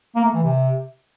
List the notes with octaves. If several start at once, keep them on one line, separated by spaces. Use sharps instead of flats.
A#3
A3
E3
C3